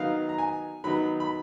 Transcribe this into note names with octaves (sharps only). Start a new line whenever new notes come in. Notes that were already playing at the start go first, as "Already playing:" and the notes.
Already playing: D#3 F#3 B3 D#4 F5
A#5
G#5
D#3 F#3 B3 D#4 B5
B5